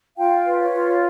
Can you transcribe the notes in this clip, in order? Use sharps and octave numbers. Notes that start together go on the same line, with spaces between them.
F4 F5 G5
B4
C#5
F4